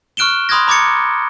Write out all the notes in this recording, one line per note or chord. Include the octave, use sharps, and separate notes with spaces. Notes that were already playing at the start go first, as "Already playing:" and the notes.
C#6 F6 F#6 D7 E7 G7
B5 C6 D#6 F#6 G#6 A#6
A#5 B5 D6 G#6 A6 C#7